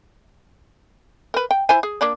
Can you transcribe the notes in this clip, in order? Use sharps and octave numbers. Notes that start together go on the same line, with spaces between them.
A#4 B4
G5
E4 C5 G#5
G#4
A#3 D4 D5